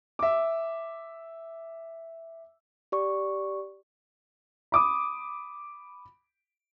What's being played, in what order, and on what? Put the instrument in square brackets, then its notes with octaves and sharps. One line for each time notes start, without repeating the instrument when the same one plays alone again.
[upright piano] E5 D6
[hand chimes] G4 D5 C#6
[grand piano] B5 D6 D#6